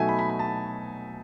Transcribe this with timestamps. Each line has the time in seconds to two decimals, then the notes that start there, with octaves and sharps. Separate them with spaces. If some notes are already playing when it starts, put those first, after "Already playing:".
Already playing: B2 F#3 A3 D#4 E5 G#5
0.09 B5
0.19 B5
0.29 B5
0.39 A5